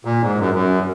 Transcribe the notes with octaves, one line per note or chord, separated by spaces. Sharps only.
A#2
G#2
F#2
F#2